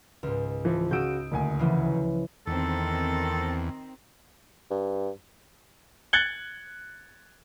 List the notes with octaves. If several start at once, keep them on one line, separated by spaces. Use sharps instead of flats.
C#2 G#2
E3 F3
C#3 F#4 D#6 E6 G6 D7
F#1 D2 G#5
C#3 E3 F3
E2 D#3 C4 A4
G2
F#6 G#6 A6 C#7 F#7 G7